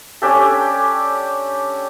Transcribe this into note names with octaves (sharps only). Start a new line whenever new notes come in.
C#4 D4 G4 A4